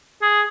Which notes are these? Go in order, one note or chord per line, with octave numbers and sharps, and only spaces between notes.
G#4